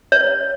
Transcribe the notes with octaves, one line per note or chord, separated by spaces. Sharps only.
C#5